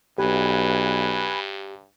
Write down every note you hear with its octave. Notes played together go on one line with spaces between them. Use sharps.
B1 G2 G4 B4 G#5